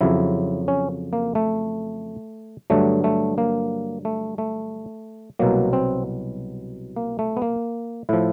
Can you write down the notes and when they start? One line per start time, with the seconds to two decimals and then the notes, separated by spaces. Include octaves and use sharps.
0.01 F2 C#3 F#3 E4
0.68 C#4
1.13 A#3
1.35 A3
2.70 G2 D3 F#3 A3
3.04 A3
3.38 A#3
4.05 A3
4.38 A3
5.39 C2 B2 F#3 A#3
5.73 C4
6.96 A#3
7.19 A3
7.37 B3
7.42 A#3
8.09 A2 F3 E4